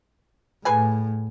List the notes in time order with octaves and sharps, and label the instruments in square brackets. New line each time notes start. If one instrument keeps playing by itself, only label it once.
[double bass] A2 [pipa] G#4 B4 G#5